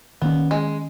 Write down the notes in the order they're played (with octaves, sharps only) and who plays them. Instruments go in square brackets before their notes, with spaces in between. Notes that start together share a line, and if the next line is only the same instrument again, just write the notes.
[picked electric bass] D#3 A#3 C#4 [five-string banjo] B3
[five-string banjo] G#3